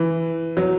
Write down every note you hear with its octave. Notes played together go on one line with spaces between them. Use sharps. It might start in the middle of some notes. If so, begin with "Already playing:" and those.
Already playing: E3
F#3